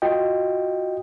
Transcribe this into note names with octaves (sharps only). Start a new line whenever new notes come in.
F4 F#4 D#5 G5